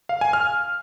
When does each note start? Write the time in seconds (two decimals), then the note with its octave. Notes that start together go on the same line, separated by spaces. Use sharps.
0.09 F5
0.21 G#5
0.33 F6